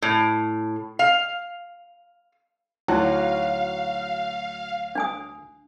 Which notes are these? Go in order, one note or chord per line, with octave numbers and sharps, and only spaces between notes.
A2
F5
D2 F#3 D#4 E4 F#4 F5 G5
D4 G#5 D#6